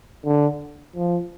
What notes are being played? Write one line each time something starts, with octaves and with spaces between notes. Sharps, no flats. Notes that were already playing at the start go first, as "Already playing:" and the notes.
D3
F3